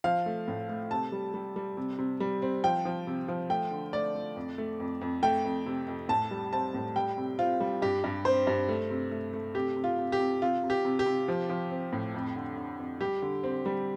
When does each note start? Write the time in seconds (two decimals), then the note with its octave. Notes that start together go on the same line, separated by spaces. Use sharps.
0.04 F3 F5
0.26 A3
0.48 A2
0.69 A3
0.91 C3 A5
1.12 G3
1.34 G3
1.56 G3
1.77 C3
1.99 C3
2.20 G3
2.42 C4
2.64 F3 G5
2.85 F3
3.07 C3
3.28 F3
3.50 A3 G5
3.71 D3
3.93 A3 D5
4.15 A3
4.36 F2
4.58 A3
4.80 F2
5.01 F2
5.23 A3 G5
5.44 F2
5.66 C3
5.88 F2
6.09 A2 A5
6.31 G3
6.53 C4 A5
6.74 A2
6.96 G3 G5
7.17 C3
7.39 C4 F4
7.60 G3
7.82 G2 G4
8.04 G2
8.25 C4 C5
8.47 G2
8.69 A3
8.90 C3
9.11 A3
9.33 A3
9.55 C3 G4
9.76 C3
9.84 F4
9.98 C3
10.12 G4
10.20 C3
10.42 C3 F4
10.64 C3
10.70 G4
10.85 C3
10.99 G4
11.06 C3
11.28 F3
11.50 F3
11.71 C4
11.93 A2
12.14 F2
12.36 D3
12.57 D3
12.79 F2
13.01 G3 G4
13.22 D3
13.43 C4
13.66 G3